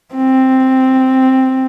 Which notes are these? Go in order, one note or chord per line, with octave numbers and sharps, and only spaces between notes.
C4